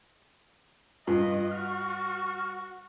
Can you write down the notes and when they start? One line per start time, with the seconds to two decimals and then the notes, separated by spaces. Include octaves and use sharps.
1.07 G2 F4 D#5
1.51 F#4 F6